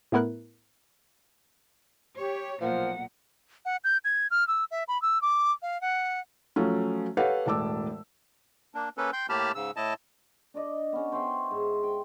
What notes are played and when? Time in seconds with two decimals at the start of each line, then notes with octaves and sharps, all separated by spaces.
0.12 A2 A3 B3 E4 A#4 F#6
2.17 G4 C#5
2.61 B1 A#2 F3 A#4 F#5
3.65 F#5
3.84 G6
4.05 G#6
4.31 F6
4.48 E6
4.71 E5
4.88 B5
5.02 E6
5.22 D6
5.62 F5
5.81 F#5
6.56 F3 F#3 A3 C#4
7.17 G4 A4 B4 C#5 F5 F#5
7.46 E1 A2 A5 D6 E6
8.75 A#3 D4
8.98 A#3 C#4 A4 B4
9.13 G5 C6 G6
9.29 A2 A#3 G4 A5 B5 F6
9.55 G#2 C#3 E6
9.76 A2 E4 D#5 A5
10.54 D4 D5 D#5
10.92 B3 C#4
11.12 C5 C#5 E5 G5
11.51 G#2
11.83 G5